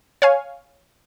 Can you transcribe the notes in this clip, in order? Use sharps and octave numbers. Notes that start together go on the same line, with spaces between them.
C#5 F5 G#5